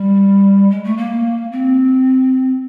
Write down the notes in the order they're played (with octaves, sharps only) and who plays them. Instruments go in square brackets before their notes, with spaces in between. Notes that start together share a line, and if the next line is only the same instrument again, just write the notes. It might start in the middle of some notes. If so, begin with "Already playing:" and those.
Already playing: [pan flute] G3
G#3
A3
A#3
C4